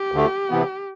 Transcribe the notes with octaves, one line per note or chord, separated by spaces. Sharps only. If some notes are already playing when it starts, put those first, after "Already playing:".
Already playing: G4
D2 D3 A3
C3 E3 B3